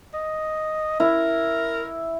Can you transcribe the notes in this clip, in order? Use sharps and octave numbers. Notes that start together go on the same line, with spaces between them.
D#5
E4 A#4